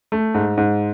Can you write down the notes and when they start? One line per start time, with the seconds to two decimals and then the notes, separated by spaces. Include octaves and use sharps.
0.12 A3
0.34 G#2
0.57 G#2